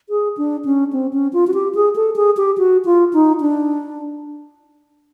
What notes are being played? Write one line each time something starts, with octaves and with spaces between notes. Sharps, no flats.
G#4
D4
C#4
C4
C#4
F4
F#4
G4
G#4
A4
G#4
G4
F#4
F4
D#4
D4